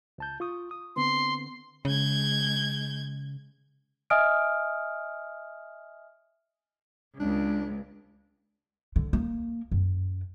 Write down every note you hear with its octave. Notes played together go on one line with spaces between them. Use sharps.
C#2 A5 G6
F4 C#6 D#6
D#6
D3 B3 C4 C6
C#3 G#3 G6 G#6
D#5 E5 G#5 D#6 F6 D7
C#2 D4
D3
A#3
F#2